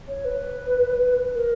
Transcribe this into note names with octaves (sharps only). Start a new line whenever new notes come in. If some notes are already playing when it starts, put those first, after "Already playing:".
C#5
B4
A#4